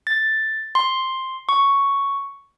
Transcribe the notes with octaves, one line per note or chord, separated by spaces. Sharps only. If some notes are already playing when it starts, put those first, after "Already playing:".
A6
C6
C#6